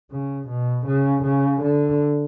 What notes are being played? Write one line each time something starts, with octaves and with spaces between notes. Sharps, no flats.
C#3
B2
C#3
C#3
D3